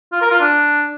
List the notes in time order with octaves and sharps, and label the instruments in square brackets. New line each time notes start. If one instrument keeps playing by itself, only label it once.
[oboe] F4
A#4
F4
D4